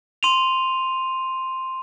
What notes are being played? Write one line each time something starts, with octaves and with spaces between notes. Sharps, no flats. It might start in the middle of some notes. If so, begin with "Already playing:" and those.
C6 D#7 F7